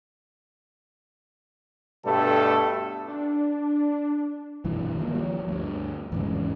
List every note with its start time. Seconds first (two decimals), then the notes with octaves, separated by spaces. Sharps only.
2.05 G2 B2 G3 A3 A4
3.08 D4
4.65 B1 G2 E3
4.99 D#3 F3 G#3 A#3
5.14 F3 G3
5.48 D2 G2
6.12 E2 G#2 C#3